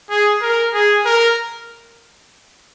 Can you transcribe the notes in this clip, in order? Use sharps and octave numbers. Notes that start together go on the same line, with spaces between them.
G#4
A#4
G#4
A#4